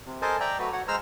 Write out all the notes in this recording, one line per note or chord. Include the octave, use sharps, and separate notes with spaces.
C3
A4 A#4 C5 D#5 G#5 A5
D5 E5 G5 A#5
F#3 A3 F#4 B4
F#4 C#5 F#5
G#3 C5 A#5 E6 F6